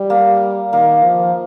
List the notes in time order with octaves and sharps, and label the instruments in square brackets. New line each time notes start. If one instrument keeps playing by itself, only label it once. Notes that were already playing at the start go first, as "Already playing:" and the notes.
Already playing: [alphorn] G3
[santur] A#3
[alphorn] D#3 [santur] A#3
[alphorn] F3